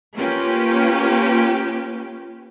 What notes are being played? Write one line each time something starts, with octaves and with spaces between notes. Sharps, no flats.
A#3 C#4 F4 G4 B4